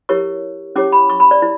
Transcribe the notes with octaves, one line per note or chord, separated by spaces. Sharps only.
E4 G4 A#4 C#5 C#6
C#4 E4 G4 C#5 D6
B5
C#6
B5
D5
E4